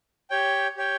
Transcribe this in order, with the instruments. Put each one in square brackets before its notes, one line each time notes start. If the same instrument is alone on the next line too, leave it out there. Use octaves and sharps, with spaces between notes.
[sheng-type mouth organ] G4 C#5 G5
G4 C#5 G5